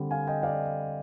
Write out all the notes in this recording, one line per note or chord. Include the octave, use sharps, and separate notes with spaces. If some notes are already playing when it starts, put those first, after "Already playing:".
Already playing: D3 G3 C4
F5 G#5
D#5 G5
D5 F5